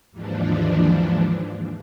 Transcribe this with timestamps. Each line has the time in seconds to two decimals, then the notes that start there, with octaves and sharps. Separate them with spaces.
0.11 D#2 G#2 E3 F3 D4